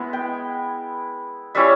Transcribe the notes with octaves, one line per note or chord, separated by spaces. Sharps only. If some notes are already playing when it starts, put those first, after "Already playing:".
Already playing: G#3 B3 E4
G5
G3 C#4 E4 E5